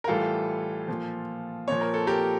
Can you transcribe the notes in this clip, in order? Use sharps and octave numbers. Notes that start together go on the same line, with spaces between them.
A#4
A2 E3 G3 F4 A4
A#2 F3
A#2 F3 C#5
A#4
A4
G4 A#4